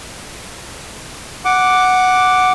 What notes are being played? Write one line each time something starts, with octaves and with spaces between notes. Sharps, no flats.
F#5 D6